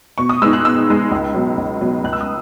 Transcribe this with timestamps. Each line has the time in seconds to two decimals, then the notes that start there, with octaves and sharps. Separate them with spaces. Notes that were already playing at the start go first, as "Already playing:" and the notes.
0.18 B2 C#6
0.29 D#6
0.42 G#3 B3 D#4 E6
0.53 F#6
0.65 B2 E6
0.88 G#3 B3 D#4
1.11 C#2
1.34 B2 F#3
1.57 C#2
1.81 B2 F#3
2.04 C#2 F#6
2.13 E6
2.21 D#6